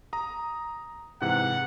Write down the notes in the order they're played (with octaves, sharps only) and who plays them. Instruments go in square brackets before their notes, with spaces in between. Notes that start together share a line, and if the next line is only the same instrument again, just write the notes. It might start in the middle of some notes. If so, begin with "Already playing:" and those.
[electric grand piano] A#5 D#6
[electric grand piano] G#2 C3 E3 [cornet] F#5